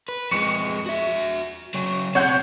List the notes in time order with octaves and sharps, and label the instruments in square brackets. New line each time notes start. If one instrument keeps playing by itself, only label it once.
[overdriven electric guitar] B4
[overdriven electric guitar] F2 G#3 [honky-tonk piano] C#6 C#7
[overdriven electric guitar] F#4 E5
C#3 F#3
[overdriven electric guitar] B2 C4 [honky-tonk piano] C#5 F#5 G6